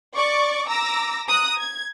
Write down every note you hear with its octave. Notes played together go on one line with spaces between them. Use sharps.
D5 C#6 D6
A#5 D6 E6 A#6
A#5 D#6 F#6
G#6